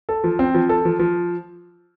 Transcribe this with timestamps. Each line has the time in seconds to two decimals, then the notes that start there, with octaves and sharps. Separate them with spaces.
0.09 A4
0.24 F3
0.39 C4
0.54 F3
0.69 A4
0.85 F3
0.99 F3